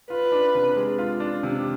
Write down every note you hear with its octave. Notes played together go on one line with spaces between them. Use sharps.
F4 B4
D4
C3
G#3
F4
D4
C3